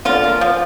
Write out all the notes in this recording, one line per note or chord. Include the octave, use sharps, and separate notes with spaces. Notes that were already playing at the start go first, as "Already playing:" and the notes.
D3 F4
A#3
F3